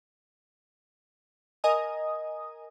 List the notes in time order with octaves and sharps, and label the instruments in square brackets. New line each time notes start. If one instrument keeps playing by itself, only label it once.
[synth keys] A#4 D#5 G#5 D#6